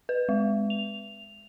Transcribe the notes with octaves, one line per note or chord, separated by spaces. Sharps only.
B4
G#3
F7